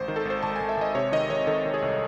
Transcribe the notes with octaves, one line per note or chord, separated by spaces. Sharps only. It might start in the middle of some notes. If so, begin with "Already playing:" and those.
Already playing: G#1 C5
D#3
A4
G#1 C5
G#1 A5
G#1 G#5
E5
G#1 D#5
C3 C#5
D#3 D#5
D#3 C#5
D#3 A4
D#3
G#4
C2